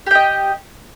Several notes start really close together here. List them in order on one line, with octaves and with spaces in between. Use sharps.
G4 G5 D#5